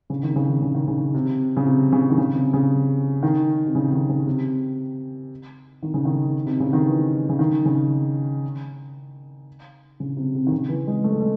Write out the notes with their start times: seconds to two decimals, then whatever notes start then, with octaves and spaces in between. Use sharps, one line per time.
0.10 C#3
0.23 D#3
0.36 C#3
0.48 D#3
0.62 C#3
0.75 D#3
0.88 C#3
1.14 C3
1.57 C#3
1.66 C3
1.92 C#3
2.10 D#3
2.18 C#3
2.36 C3
2.53 C#3
3.23 D#3
3.67 C3
3.75 C#3
3.92 D#3
4.09 C#3
4.26 C3
5.83 D#3
5.94 C#3
6.05 D#3
6.46 C3
6.60 C#3
6.73 D#3
6.87 E3
7.29 C#3
7.39 D#3
7.65 C#3
10.00 C#3
10.17 C3
10.35 C3
10.47 D#3
10.52 C#3
10.69 E3
10.87 G#3
11.04 A3
11.12 G#3
11.20 A3